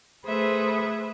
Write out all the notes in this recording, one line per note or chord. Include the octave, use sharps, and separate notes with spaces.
A3 G#4 A4 B4 C5 E5